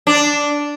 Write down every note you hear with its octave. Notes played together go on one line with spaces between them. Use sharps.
D4